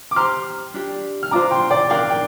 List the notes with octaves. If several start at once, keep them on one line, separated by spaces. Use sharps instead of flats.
D6
G4 C5 A#5 C6 F6
D4 G4 D5
F6
D4 F4 C5 A#5 D6
G5 C6
D5 G5
D4 A#4 D5 F5 G5
G5